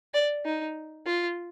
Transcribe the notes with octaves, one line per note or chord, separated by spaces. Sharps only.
D5
D#4
F4